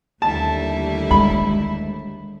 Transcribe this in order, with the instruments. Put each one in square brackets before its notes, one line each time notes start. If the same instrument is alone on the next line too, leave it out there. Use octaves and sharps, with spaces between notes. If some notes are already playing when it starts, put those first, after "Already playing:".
[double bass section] D#2 A3 [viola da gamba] D3 G3 E4 [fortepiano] A5
[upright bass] G#3 [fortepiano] B5